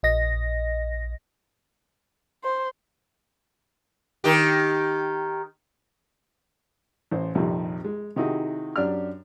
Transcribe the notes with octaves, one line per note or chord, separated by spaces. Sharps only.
A#1 D#5 A#6
C5
D#3 G4
A1 C5
A#1 F2 C3 D#3 G3
G#3
C3 D#3 D#4 E4 F#4 G#4
F#2 D4 G4 F6